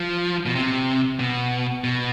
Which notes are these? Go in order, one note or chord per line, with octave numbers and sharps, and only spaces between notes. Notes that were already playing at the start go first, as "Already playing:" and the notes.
Already playing: F3
B2
C3
B2
B2